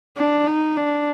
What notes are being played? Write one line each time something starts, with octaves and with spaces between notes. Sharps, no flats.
D4
D#4
D4